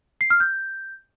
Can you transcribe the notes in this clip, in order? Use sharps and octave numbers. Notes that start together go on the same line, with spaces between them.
C7
F6
G6